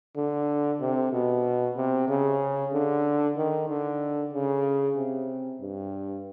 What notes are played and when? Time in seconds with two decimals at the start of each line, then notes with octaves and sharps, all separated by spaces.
0.16 D3
0.81 C3
1.13 B2
1.76 C3
2.09 C#3
2.73 D3
3.36 D#3
3.68 D3
4.33 C#3
4.97 C3
5.61 G2